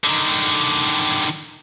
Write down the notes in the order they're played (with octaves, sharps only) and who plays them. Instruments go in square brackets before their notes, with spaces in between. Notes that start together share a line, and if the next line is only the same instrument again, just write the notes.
[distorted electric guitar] D3 D#3